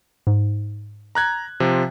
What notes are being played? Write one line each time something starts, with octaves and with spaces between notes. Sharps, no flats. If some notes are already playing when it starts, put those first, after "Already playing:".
G#2
A#5 F#6 G#6
C3 F3